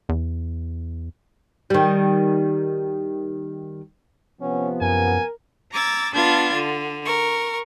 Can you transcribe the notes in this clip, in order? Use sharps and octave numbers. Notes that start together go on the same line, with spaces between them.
E2
D#3 G3
C3 F3 B3 C#4
F#2 A#4 G#5
A#5 D6 E6 G#6 A6
B3 D4 F4 A5 G#6
D3
A#4 C#6